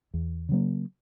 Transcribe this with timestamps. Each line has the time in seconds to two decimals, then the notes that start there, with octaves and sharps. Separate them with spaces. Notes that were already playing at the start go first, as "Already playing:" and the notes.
0.14 E2
0.49 C#3 F#3 A#3